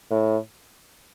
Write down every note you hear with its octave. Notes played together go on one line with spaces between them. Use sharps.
A2